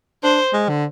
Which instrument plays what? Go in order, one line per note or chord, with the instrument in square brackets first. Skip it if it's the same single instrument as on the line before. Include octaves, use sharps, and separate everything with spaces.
[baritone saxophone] D4 [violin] C5
[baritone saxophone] G#3
D3